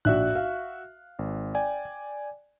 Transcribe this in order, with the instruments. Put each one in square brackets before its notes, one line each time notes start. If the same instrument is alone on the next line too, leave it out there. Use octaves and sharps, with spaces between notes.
[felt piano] A#1 [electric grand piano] F#4 E5 F#6
[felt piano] F5
[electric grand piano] G#1
D5 G5 G#5